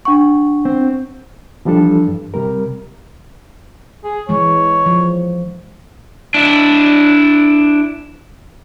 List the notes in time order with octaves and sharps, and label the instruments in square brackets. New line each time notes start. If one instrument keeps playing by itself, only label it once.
[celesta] D4 F#5 C#6
[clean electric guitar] C4
[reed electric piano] E3 F3 G3 D4 A4
G2
C3 G3 A#4
[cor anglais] G#4
[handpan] E3 G#3 [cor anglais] C#5
[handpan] F3
[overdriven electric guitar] D4 E4